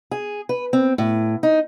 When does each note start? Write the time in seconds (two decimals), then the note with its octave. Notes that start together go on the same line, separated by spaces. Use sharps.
0.11 G#4
0.49 B4
0.73 C4
0.98 A2
1.43 D#4